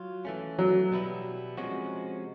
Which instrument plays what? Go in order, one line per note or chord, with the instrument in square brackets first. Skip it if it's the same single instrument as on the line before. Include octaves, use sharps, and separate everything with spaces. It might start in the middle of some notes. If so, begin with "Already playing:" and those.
Already playing: [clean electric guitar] F#3 F4
E3 A3 C#4
[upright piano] F#3
[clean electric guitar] B2 G3 B3 E4
C3 F3 G#3 C#4 F#4